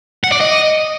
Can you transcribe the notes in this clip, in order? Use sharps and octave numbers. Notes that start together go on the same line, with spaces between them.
F#5
D5
D#5